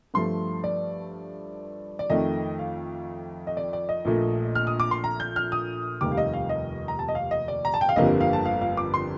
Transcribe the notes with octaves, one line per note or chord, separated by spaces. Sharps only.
G2 F3 A3 C6
D5
D5
F2 D#3 A3 D#5
F5
D#5
D5
D5
D#5
A#1 A#2 A3
F6
D#6
D6
C6
A#5
G6
F6
D#6
F1 D#2 D#3 G3 D6
F5
D#5
F5
D#5
A#5
A5
D#5
F5
D#5
D5
A#5
A5
G5
F5
G1 F2 D3 G3 A#3 D#5
F5
A5
F5
F5
D6
C6